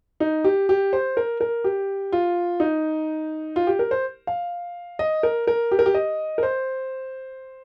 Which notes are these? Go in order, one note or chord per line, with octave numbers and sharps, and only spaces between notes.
D#4
G4
G4
C5
A#4
A#4
G4
F4
D#4
F4
G4
A#4
C5
F5
D#5
A#4
A#4
G4
A#4
G4
D#5
A#4
C5